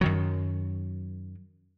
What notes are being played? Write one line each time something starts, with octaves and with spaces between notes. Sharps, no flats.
F#2 D#3 F#3